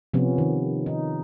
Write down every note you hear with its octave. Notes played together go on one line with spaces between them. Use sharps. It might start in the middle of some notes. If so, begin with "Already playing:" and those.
C3 F3 B3 C#4
D#3
D#4